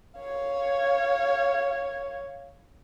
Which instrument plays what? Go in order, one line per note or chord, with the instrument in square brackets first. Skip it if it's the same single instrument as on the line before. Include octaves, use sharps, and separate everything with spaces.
[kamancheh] C#5 F5